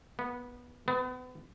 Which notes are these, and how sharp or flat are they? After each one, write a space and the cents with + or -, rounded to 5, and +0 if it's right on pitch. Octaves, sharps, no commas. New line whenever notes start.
B3 -15
B3 +35